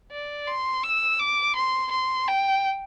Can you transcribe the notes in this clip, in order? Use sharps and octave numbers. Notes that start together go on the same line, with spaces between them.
D5
C6
E6
D6
C6
C6
G5